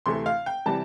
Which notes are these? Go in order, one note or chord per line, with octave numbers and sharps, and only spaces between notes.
D2 C3 E3 A3 C6
F5
G5
C3 E3 G3 A5